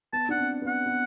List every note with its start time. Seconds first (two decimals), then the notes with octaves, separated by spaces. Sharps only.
0.13 B3 A5
0.29 D4 F#5
0.38 C4
0.62 B3
0.67 F#5
0.86 B3